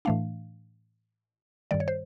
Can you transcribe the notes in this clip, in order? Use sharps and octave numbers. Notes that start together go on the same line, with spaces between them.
A2 E3 A3 D4 F5
G2 D#3 G3 D5
C#5
C5